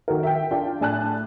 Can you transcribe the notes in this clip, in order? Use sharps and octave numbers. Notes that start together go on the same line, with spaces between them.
D#3 F#4 A#4
E5 G5
D4 F4 G5
A2 D4 G#5 A5 F#6